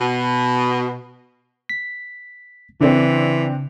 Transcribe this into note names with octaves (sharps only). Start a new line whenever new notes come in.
B2
B6
C#3 E3 C4 D4